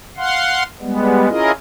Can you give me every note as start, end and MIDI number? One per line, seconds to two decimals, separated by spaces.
0.17 0.63 77
0.17 0.63 78
0.17 0.63 84
0.81 1.29 55
0.81 1.29 56
0.81 1.29 59
1.29 1.52 61
1.29 1.52 64
1.29 1.52 65
1.29 1.52 68
1.29 1.52 70
1.29 1.52 75